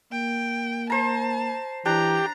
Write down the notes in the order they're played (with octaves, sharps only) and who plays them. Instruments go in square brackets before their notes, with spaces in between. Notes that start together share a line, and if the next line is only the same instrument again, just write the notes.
[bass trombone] A#3 [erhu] G5
[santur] C5 A#5 [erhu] A5
[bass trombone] E3 [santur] D4 [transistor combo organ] G4 [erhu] A#5